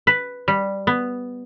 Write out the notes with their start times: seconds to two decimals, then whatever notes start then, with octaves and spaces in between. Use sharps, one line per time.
0.07 B4
0.48 G3
0.87 B3